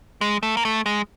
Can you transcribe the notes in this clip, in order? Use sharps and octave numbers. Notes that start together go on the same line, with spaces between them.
G#3
A3
A#3
A3
G#3